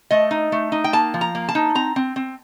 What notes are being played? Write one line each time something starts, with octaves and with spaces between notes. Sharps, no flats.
A3 D#5
D#4
A3
D#4
G5
A#3 A5
F3
A#5
A#3
A5
D#4
C4 A#5
C4
C4